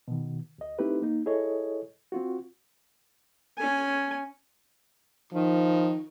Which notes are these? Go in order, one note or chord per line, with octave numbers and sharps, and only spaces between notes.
B2 D#3
D2 D#5
A3 C4 D#4 E4 G4 B4
A#3 D#4
E4 G#4 A4 C#5 D#5
C4 F4 F#4
C#4 G#5
D#3 F3